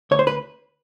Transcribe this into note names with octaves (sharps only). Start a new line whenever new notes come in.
D2 C#5
C5
B4